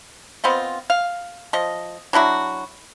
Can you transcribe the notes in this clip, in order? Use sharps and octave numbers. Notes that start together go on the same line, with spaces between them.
B3 C4 F4 D#5
F5
F3 D#5
F#3 D4 E4 F#4